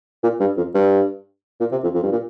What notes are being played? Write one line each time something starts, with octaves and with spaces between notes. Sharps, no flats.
A#2
G2
F2
G2
A#2
C3
F2
F2
G2
A#2